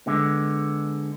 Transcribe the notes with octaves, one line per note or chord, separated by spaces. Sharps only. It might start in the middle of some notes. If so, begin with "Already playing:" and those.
D3 G#3 B3